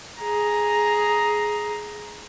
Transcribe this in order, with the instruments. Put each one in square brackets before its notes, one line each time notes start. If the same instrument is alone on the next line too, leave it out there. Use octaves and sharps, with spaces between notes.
[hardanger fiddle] G#4 A#5